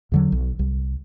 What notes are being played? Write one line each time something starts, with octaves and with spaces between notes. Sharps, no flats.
E2 D3 F#3
B1
C2